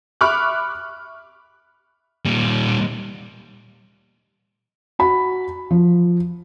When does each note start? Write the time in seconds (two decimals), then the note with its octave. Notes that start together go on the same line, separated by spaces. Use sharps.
0.21 E5 B5 C#6 D6 F6 F#6
2.25 A#2 G3
4.99 F#4 B5
5.71 F3